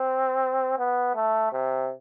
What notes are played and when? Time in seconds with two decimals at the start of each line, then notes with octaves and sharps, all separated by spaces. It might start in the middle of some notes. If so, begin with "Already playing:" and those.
Already playing: C4
0.78 B3
1.15 A3
1.52 C3